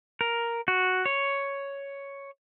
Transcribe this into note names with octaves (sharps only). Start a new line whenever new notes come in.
A#4
F#4
C#5